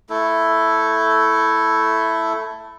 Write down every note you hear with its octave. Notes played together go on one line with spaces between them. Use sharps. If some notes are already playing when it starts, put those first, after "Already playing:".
A3 E4 A4